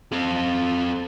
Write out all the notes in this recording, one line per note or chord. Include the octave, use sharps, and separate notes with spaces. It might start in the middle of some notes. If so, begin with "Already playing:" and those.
C4 A4